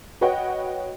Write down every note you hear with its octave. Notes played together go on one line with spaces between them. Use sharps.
F#4 B4 C#5 D#5 F#5 G5